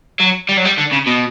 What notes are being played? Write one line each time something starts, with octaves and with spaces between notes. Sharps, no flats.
F#3
G3
F#3
G3
D3
C#3
B2